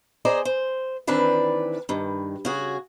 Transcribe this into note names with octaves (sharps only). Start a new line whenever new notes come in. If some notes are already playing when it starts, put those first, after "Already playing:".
G#4 C5 D5 D#5 G#5 A#5
C5
D#3 E3 C4 D4 B4 D5
G2 D#3
C#3 F#4 G#4